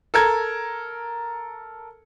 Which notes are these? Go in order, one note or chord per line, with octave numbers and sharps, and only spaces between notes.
A4 A#4 G#6